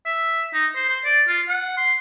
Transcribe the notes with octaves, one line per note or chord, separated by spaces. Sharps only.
E5
D#4
C5
C5
D5
F4
F#5
C6